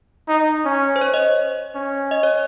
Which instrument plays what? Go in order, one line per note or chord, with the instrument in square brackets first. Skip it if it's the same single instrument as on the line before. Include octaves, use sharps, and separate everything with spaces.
[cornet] D#4
C#4
[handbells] C5
C#5
D#5
[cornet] C#4
[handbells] D#5
C#5